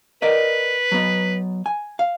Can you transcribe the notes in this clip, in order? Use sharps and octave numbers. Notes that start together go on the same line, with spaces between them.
A#4 B4 D5 D#5
F#3 B3
G#5
F5